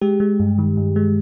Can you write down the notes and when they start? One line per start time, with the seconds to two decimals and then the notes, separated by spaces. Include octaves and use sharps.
0.01 G#3 G4
0.20 G#3
0.40 G2
0.58 D#3
0.77 G2
0.96 G#3